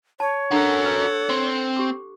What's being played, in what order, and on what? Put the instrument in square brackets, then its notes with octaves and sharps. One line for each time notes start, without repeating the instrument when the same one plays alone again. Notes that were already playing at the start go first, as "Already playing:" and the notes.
[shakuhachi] C#5 [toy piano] A5
[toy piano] D4 [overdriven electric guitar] F#4 A#4 [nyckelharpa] A4 F#5
[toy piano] B4
[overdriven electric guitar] C4 [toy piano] C6
[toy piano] G4 D6